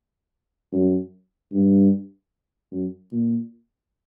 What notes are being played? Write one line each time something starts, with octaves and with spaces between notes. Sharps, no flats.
F#2
G2
F#2
A#2